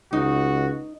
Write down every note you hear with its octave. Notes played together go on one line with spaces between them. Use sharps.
C#2 D#4 F#4